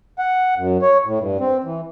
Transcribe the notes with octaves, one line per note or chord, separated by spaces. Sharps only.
F#5
F#2
C#5
A2
G2
C4
E3